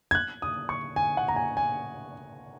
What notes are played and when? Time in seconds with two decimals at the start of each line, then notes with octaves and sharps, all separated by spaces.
0.11 G#6
0.15 F#6
0.42 D#6
0.69 C#6
0.96 G#5
1.17 F#5
1.28 A#5
1.36 G#5
1.57 G#5